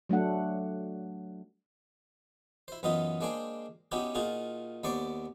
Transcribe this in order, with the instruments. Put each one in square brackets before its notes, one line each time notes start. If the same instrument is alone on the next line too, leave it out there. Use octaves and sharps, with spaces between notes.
[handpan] F#3 A3 D4 F#5
[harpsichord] E4 C5
F#2 E3 B3 D#4 F4 D#5
G#3 A#3 D4 G#4 C5 G5
B3 C#4 D#4 E4 F#4 G4
A#2 D#4 F4 F#4 G#4
D#2 B3 C5 D5 C#6 D6